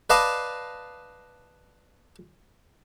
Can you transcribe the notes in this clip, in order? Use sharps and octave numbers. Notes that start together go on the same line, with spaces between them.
B4 D5 D#5 F5 A5